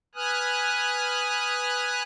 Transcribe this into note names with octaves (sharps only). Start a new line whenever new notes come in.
B4 G#5 D#6 F6 F#6